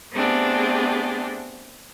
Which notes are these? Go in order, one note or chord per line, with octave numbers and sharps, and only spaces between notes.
A3 B3 C4 D4 G4 G#4